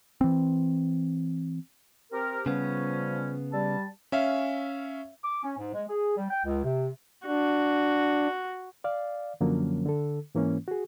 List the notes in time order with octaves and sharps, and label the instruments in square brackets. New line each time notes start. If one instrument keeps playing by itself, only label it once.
[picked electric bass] E3 C4
[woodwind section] C4 G4 A#4
[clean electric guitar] C#3 B3 [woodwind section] F3 G3 C#4
[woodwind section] G3 A5
[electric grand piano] C#4 E5 F5
[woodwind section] D6
C#4
G#2
G#3
G#4
G3
G5
C#2
C3
[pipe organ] D4 [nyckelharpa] F#4
[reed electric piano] D5 F5
F#2 D3 F3 F#3 A#3 C#4
D3 A4
G#2 E3 A#3 C#4
F#4 G#4